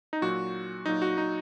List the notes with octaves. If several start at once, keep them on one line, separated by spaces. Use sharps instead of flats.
D#4
A#2 F#3 F#4
A#2 F#3 D#4
F#4
D#4